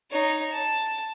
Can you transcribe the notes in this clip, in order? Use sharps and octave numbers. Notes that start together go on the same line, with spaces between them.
D#4 C#5
A5